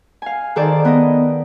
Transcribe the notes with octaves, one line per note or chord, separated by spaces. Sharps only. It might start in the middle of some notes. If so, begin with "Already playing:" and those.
F5 G#5
D#3 G#4 A4 C5 D5
B3 D#5